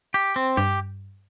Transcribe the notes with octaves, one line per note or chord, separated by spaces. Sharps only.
G4
C4
G2 G4